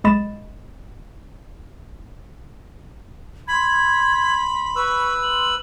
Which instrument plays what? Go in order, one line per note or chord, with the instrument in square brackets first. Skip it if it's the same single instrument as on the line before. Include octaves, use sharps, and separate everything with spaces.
[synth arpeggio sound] B1 G#3 D#5 B5 A6 E7
[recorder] B5 [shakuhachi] C6 [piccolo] G#6
[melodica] B4 E6 [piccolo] C#6
[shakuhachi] C6 [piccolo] F#7